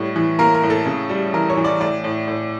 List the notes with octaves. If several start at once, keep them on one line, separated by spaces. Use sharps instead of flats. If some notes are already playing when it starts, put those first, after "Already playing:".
Already playing: A2 G3 C#5
E3
A#3 A#4
A#4
A2
A4
C#3
G3
E3 A#4
C#5
E3
D5
A2 D5
A2
A2